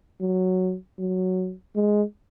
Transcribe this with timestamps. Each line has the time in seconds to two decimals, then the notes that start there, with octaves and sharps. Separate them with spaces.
0.21 F#3
0.99 F#3
1.75 G#3